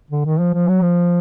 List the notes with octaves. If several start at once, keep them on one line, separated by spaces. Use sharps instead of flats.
D3
D#3
F3
F3
F#3
F3